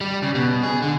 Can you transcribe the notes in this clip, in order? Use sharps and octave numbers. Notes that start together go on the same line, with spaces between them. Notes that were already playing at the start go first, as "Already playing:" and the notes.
G3
C#3
B2
G#4
D3